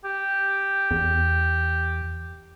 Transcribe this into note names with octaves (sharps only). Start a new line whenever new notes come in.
G4
E2